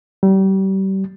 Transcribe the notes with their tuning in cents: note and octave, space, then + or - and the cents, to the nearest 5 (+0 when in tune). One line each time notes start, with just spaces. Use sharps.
G3 -30